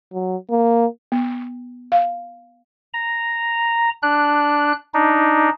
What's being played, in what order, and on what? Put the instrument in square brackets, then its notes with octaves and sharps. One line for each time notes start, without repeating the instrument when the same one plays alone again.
[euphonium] F#3
A#3
[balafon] B3
F5
[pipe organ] A#5
D4 F#6
D4 D#4